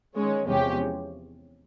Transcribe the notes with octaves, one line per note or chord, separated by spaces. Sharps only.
D#3 G#3 C#4 C#5
E2 C3 F3 G#3 C#4 G4